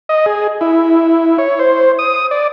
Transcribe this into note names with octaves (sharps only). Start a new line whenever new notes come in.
D#5
G#4
E4
C#5
C5
D#6
D5